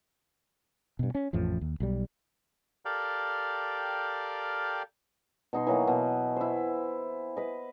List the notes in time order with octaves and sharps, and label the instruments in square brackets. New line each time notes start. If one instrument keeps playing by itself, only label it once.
[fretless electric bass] G2 B2
C#4
A1 F2 A2 F3
D#2
B1 G3
[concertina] G4 A4 A#4 D5 F5 G5
[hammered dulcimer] B2 D#4 C6
E3 F#3 A#3
B2
E4 C5
B4 D#5